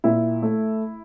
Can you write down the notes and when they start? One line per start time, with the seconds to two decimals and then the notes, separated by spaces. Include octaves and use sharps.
0.04 A#2 E4
0.42 A3